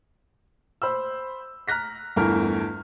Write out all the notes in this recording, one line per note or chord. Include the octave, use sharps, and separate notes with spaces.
C5 B5 E6
A#5 F6 F#6 A#6 B6
G1 E2 G2 A3 A#4 F6